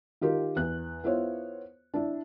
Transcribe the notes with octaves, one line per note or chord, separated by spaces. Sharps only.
D#3 F4 G4 A#4
E2 F#6
B3 E4 F4 C5 C#5
D4 E4